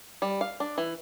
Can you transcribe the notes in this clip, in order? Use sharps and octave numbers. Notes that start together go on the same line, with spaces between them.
G3
F5
D4
E3